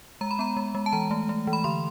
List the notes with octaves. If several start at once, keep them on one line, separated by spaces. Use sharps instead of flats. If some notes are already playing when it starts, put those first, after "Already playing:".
G#3 A#5
B5
B3 A#5
G#3
G#3
A5
E3 A#5
A3
A3
E3
B5
D3 C6